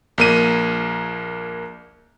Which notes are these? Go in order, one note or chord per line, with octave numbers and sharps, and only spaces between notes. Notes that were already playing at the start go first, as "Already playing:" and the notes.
A#1 A#3 D#7